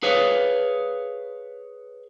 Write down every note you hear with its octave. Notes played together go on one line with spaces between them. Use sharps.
G#4 B4 C#5 F5